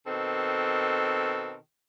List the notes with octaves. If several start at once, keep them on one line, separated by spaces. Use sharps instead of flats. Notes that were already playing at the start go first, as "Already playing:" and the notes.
B2 D#3 C4 A4